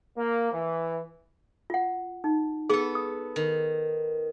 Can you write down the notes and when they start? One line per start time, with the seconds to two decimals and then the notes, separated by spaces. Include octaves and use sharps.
0.17 A#3
0.52 E3
1.70 F4 F#5
2.24 D#4
2.69 B3 G#4 A4
2.95 D#6
3.36 D#3